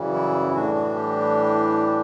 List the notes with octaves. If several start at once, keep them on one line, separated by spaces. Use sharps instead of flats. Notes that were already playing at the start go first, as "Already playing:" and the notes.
Already playing: F#2 C#3 E3 G3
E4
A2 E3 G3 D4 F#4
F#4
G4